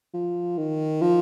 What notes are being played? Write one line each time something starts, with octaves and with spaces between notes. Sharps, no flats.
F3
D#3
F3